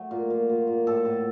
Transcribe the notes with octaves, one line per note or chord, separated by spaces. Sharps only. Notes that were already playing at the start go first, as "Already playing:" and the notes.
Already playing: F#3 A3
A#2
A#2
A#2
A#2
A2 A4
A2